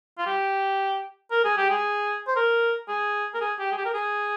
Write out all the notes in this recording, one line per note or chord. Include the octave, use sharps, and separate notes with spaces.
F4
G4
A#4
G#4
G4
G#4
C5
A#4
G#4
A#4
G#4
G4
G#4
G4
A#4
G#4